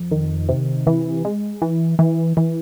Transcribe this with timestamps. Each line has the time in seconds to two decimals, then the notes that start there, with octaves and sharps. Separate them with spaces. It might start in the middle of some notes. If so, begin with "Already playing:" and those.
Already playing: F2
0.11 D#3
0.49 C3
0.87 E3
1.25 G#3
1.62 E3
1.99 E3
2.37 E3